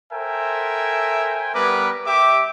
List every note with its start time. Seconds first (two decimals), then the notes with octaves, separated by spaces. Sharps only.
0.12 A4 A#4 C5 E5 G5 G#5
1.55 G3 B3 G4 A#4 B4 D6
2.07 G4 E5 D6